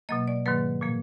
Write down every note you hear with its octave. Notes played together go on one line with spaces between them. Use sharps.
B2 F#3 A#3 D#5
D5
G#2 D#3 F#3 A#3 B4
A#2 F3 A#3